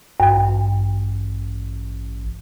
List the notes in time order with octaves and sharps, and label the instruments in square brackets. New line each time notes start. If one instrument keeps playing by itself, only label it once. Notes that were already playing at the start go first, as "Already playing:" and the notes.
[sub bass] A1 [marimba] G2